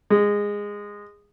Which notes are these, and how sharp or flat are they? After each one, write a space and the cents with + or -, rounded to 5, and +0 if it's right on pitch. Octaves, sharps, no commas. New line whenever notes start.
G#3 -15